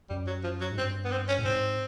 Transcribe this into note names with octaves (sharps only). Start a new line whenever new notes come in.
F#2 G3
F#3
F3
F#3
G#2
G2 C4
B3
C4
C#4
A2
G#2 C4